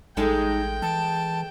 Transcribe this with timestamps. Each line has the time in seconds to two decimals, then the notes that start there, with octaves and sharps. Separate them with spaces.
0.17 A1 G#3 D#4 A4 G5
0.82 E3 A5